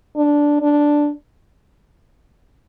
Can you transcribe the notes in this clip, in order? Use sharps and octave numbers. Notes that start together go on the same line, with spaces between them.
D4
D4